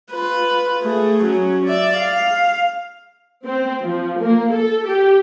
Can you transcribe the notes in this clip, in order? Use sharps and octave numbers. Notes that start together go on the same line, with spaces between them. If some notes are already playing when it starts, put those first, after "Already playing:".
F4 B4
A3 G#4
F#3 C#4
D5 E5
F5
C4
F3
A#3
A4
G4